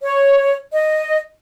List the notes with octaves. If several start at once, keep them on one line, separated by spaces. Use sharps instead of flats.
C#5
D#5